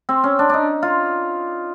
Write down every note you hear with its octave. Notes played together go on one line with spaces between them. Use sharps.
C4
C#4
D4
D4 D#4
F4